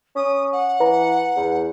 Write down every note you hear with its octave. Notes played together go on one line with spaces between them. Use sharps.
C#4 D#6
F#5
E3 B4 A#5
E2